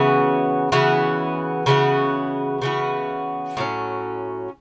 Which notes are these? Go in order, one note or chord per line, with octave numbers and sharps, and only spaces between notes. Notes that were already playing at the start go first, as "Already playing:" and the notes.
Already playing: C#3 E3 B3 F#4
C#3 E3 B3 F#4
C#3 E3 B3 F#4
C#3 E3 B3 F#4
A2 F#3 C#4